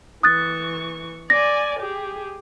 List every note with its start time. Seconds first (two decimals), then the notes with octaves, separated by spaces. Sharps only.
0.23 E3 C#6 D#6 F#6 A6
1.30 D5 G#5 A#6
1.79 G4 G#4